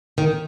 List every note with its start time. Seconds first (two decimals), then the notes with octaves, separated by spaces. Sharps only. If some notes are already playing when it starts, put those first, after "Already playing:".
0.18 D#3